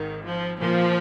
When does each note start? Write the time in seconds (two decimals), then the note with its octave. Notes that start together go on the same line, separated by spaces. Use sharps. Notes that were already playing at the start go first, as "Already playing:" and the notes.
Already playing: G#1 G#2 D#3
0.24 F3
0.61 A#2 F3 A#3 F4